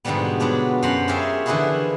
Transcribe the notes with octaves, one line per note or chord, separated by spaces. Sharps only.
G#2 B2 D3 F3 G3 B3
F#3 B3 D4 F4
F#2 C5 F#5 A#5 B5
F4 G4 G#4 A#4 C#5 E5
D3 E3 F3 E4 F#4 G#4